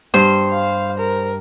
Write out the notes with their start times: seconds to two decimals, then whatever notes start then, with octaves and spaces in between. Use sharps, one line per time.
0.14 G2 C5
0.51 F5
0.99 A#4